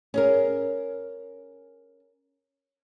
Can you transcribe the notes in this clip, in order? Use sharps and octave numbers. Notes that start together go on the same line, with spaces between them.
C#4 G#4 A#4